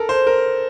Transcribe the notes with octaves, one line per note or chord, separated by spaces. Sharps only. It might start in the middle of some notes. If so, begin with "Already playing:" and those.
Already playing: A4 A#4
C5
A#4